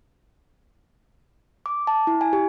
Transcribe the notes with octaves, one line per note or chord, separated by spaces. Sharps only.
D6
A5
E4
G#5
G4